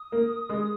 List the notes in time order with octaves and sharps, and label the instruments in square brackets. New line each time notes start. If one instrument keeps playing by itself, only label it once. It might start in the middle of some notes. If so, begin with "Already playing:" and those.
Already playing: [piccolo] D#6
[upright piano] A#3
G#3